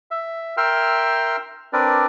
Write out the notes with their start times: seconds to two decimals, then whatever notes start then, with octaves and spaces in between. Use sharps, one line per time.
0.11 E5
0.57 A#4 E5 G5 C6 E6 F6
1.73 C4 D4 A#4 B4 D5